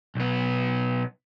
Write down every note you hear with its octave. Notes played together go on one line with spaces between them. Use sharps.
B1 B3